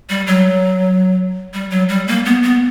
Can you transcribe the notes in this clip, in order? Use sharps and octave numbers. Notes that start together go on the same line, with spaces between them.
G3
F#3
G3
F#3
G3
A#3
B3
B3